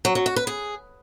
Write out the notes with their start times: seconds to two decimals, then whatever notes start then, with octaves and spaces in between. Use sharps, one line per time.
0.05 F#3
0.15 F#3
0.26 F#4
0.36 B4
0.47 G#4